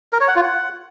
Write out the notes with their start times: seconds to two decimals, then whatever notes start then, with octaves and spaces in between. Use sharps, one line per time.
0.13 A#4
0.20 C#5
0.28 F#5
0.36 F4
0.43 F#5